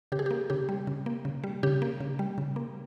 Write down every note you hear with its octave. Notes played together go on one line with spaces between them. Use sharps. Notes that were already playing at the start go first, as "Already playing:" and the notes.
C#3 G4
G#4
G4
A#3
C#3 G4
G3
C#3
A#3
C#3
G3
C#3 G4
A#3
C#3
G3
C#3
A#3